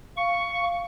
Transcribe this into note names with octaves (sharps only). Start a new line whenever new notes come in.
F5 C#6